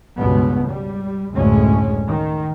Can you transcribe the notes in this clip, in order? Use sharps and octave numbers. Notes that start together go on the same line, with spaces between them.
C#2 G2 B2 B3
G3
F#1 D2 A2 G#3 C#4
D#3